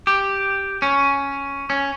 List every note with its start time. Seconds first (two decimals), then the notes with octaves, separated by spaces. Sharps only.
0.07 G4
0.82 C#4
1.70 C#4